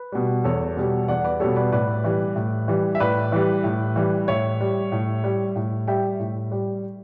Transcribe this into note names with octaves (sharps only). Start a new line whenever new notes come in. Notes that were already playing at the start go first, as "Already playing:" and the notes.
Already playing: B4
B2 G3
E2 A4 C#5
B2 G3
E2 D5 F#5
B4 D5
B2 G3 A4 C#5
B4 D5
A2 B4 D5
E3 G3
A2
E3 G3
E5
A2 B4 D5
E3 G3
A2
E3 G3
A2 C#5 E5
G3
A2
G3
A2
G3 E5 G5
A2
G3